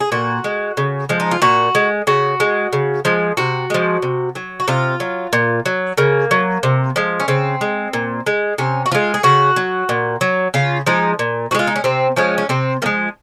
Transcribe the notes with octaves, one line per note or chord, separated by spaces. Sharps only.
G#4
A#2 F#4
G#3
C#3
F3 G#3
D#4
F4
A#2 F#4
G#3
C#3 F#4
G#3
C#3
F3 G#3
C3 F#4
F3 G#3
C3
F#3
F#4
C3 F4
F#3
A#2
F#3
C#3 A#3
F#3
C3
F3 G#3
C#4
C#3 C4
G#3
A#2
G#3
C3 C#4
F#4
F3 G#3 F4
G#4
C#3 F#4
F#3
A#2
F#3
C#3 F4
F3 G#3 D#4
A#2
F3 F#4
G#3 F4
D#4
C#4
C3 C4
F3 G#3 C#4
C#4
C3 C4
F3 G#3 A#3